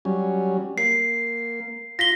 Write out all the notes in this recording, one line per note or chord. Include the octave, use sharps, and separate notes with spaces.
F#3 G3 C#4
A#3 C7
F4 A#6 B6 G7